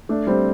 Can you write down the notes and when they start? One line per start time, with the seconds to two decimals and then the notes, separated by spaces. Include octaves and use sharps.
0.09 A3 D4
0.27 G3 C4